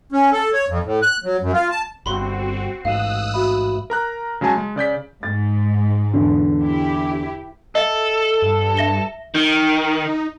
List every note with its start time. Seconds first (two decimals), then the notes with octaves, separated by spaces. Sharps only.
0.12 C#4
0.32 A4
0.53 C#5
0.68 F2
0.84 A2
1.02 F#6
1.24 F#3
1.41 F#2
1.53 F4
1.70 A5
2.06 G1 C4 F#4 B5 C6
2.85 A1 G#2 F5 D#6 E6 F#6
3.34 F#4 E5 B5
3.90 A#4 A#5 F#6
4.41 C#3 F#3 G#3 G#5 A5
4.58 G#3
4.76 C#3 D5 G6 B6
5.23 G#2 A6
6.14 E2 D3
6.61 E4 G4
7.75 A4 D#5 E5
8.42 G2
8.77 E5 A#6 G7
9.35 D#3 D#4 G6